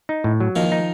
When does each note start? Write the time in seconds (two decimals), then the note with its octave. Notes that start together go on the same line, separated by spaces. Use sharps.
0.09 D#4
0.24 A2
0.40 F#3
0.56 D#3 F3 A#3
0.72 D#4